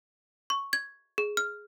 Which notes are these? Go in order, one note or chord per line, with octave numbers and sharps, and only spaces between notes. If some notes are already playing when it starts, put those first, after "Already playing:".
C#6
G#6
G#4
F6